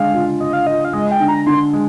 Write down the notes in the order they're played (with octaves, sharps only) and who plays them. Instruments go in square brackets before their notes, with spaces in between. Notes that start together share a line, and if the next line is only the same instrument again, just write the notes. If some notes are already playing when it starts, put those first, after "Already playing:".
Already playing: [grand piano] D3 G#3 [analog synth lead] F5
[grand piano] F4
[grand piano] F4 [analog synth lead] D#5
[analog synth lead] F5
[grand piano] F4 [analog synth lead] D#5
[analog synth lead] F5
[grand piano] G#3 [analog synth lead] D#5
[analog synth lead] G5
[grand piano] D3
[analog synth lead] A#5
[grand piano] D3 [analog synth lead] C6
[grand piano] G#3